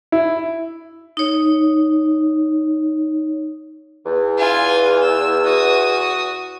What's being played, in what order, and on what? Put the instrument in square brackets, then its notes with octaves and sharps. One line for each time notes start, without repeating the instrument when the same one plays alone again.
[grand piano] E4
[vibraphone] D#4 C#5
[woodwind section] E2
[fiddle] F4 G#5
E6
F#4 D#6